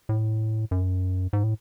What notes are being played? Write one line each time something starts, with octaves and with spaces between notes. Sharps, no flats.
A2
F#2
G#2
A2